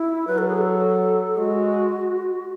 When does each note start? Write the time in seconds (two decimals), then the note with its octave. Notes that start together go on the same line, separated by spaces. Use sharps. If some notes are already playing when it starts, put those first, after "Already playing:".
Already playing: E4
0.27 F#3 B4
0.38 A4
0.48 G#4
0.58 A4
1.37 G#3 F#4